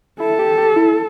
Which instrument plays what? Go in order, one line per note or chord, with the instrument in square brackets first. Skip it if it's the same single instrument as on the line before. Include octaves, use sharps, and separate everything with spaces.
[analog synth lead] E4 [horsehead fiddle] A4
[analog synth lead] G4
G4
E4